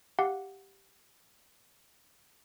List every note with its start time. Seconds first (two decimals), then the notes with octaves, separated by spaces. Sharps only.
0.19 G4 F5 F#5